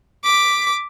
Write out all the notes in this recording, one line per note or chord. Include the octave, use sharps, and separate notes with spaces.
D6 B6